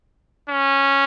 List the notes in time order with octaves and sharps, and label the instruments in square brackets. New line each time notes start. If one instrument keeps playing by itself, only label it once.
[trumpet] C#4